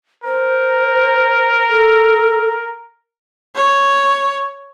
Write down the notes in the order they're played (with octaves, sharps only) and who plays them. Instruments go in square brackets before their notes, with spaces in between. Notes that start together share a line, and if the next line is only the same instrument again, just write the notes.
[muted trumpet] A#4 [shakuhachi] C5
[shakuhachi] A4
[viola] C#5